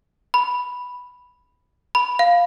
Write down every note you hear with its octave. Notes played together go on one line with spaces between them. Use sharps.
B5
B5
F5